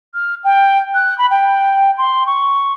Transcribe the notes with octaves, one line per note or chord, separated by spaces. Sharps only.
F6
G5
F#6
B5
G5
C6
C#6